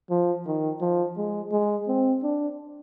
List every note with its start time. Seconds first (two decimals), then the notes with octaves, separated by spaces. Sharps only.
0.10 F3
0.46 D#3
0.81 F3
1.17 G#3
1.52 G#3
1.88 C4
2.23 D4